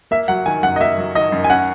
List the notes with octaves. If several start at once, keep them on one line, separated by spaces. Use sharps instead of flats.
A#3 E5
F#3 F#5
D#3 G#5
F#2 F#5
D#5
A#3 E5
F#3
D#3 D#5
F#2
G#5
C#4 F#5